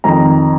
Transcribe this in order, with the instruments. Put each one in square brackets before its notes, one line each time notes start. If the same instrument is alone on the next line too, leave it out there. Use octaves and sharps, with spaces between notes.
[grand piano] F2 D#3 A#5